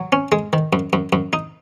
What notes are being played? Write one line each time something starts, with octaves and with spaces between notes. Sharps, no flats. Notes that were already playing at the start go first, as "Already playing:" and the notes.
Already playing: F#3
C#4
G#3
D#3
F#2
F#2
F#2
D#4